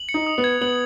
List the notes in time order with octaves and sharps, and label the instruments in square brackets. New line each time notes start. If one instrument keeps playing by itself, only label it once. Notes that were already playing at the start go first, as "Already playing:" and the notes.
Already playing: [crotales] F#7
C#7
[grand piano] D#4
[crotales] D#6
[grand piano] B3
[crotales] G#6
[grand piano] B3 [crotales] F#7